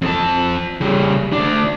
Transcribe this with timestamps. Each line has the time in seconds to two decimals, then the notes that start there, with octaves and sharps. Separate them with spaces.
0.02 F2 A5
0.81 C#3 G3
1.32 D2 D4